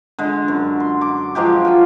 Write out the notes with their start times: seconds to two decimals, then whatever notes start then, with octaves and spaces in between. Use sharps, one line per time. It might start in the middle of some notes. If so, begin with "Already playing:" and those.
0.19 D3 G#3
0.48 F#2
0.80 C6
1.01 D6
1.35 F3 F#3 G#3 G4
1.65 F4 G5 G#5